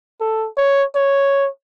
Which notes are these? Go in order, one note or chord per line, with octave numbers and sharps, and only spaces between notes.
A4
C#5
C#5